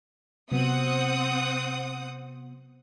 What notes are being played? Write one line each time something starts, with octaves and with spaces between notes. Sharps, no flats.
C3 F#3 B3 C4 F#5 D#6